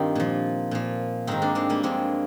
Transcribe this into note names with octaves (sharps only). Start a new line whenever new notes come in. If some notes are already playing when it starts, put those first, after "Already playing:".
Already playing: G2 D#3 C4 D#4 F4
A#2 F3
A#2 F3
G#2 D#3 C4 D#4
A#3 D4
G#3 C4
G3 A#3
G2 F3 G#3 C4